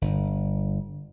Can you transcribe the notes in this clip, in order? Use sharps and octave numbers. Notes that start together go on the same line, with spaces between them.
G1